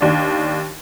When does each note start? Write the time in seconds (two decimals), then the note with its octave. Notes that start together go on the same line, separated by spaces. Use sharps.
0.01 D#2 D4